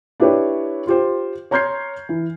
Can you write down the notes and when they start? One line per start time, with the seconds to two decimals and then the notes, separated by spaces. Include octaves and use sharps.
0.20 D4 E4 G4 B4 C#5
0.87 F4 G4 C5
1.51 C#5 A#5 C6 G6 G#6 C7
2.09 E3